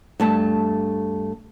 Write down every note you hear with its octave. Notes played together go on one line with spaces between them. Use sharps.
G2 A3 A5